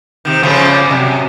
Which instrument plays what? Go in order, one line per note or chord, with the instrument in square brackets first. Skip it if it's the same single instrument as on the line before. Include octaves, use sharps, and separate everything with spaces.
[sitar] C3 D#3
[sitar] C#3 F3 A3 [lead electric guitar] C#4 C5
[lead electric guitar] G#4 D5
[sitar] F#2 [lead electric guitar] C3